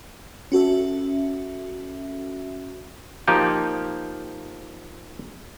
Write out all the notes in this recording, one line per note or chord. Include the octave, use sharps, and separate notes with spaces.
C#4 F#4 A4 E5
F3 A#3 D#4 G4